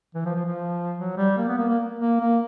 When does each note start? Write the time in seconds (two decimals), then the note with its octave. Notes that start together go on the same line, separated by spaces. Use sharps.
0.15 E3
0.25 F3
0.35 F3
0.46 F3
0.97 F#3
1.17 G3
1.38 A#3
1.48 B3
1.58 A#3
1.69 A#3
1.99 A#3
2.20 A#3